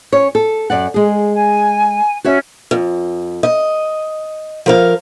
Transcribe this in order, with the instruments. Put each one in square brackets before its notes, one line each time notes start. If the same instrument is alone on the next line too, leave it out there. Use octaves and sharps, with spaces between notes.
[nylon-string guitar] C#4 C#5
A4
F#2 D5 F#5
G#3 G#4
[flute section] G#5
[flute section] C#4 [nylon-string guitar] F#4 C#5 E5
[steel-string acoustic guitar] F2
D#5
F3 A#4 F5